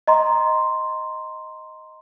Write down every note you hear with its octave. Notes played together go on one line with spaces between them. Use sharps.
D#5 A#5 C6